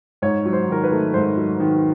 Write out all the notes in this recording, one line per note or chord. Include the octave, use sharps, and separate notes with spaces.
G#2 C#5
F#3
C5
D#3 A#4
B4
A3
G#2 C5
F#3
D#3